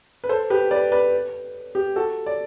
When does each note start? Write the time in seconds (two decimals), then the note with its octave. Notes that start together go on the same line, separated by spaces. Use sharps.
0.24 B4
0.29 A4 C5
0.50 G4 B4
0.71 B4 D5
0.92 B4 D5
1.75 G4
1.96 F#4 A4
2.26 D5